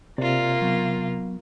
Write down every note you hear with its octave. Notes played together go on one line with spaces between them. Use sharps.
C3 A#3 F4 D5
F#3 B3